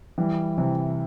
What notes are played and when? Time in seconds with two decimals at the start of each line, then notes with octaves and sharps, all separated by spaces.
0.18 E3 G3
0.58 C3 E3